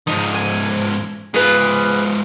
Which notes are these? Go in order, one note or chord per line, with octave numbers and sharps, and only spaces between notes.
G#2 F3 D#4
G#5
G#2 F4 G#4 B4